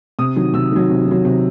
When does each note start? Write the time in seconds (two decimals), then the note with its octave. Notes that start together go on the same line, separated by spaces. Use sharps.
0.19 C3 D#6
0.36 D#3 F#3
0.54 C3 E6
0.72 D#3 F#3
0.90 C3
1.07 D#3 F#3
1.25 C3